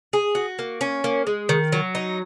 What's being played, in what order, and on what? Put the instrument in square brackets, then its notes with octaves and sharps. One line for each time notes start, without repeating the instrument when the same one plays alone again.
[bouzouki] G#4
F#4
A#3
C#4
A#3
G#3
D#3
F#3
D#4